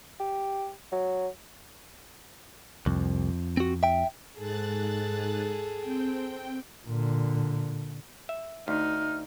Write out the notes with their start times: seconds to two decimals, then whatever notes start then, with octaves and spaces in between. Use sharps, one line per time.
0.20 G4
0.92 F#3
2.86 C2 F2
3.57 C4 F#4
3.83 E5 G5
4.37 G#2 G#4 A4 F#6 A6
5.80 C4 G5
6.88 A#2 D3
8.29 E5
8.68 D2 D#4 F6